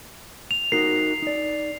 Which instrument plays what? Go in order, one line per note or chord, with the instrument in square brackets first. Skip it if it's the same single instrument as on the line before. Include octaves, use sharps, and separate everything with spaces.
[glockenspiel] F7
[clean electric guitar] D#4 F#4 A#4 [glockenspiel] C7
[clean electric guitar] D#4 D5